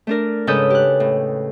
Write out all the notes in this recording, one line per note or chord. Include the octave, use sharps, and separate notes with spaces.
A3 D4 A#4
G#2 C#3 A4 B4 D#6 G6
G4 F#6
A2